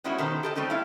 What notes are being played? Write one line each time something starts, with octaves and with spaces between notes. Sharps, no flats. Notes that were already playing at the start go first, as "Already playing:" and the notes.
G3 G#3 B3 C#4 E4 F#4
B2 D#3 A4 C5
G4 A4 D#5
G3 A3 C4 C#4 D#4
E4 F5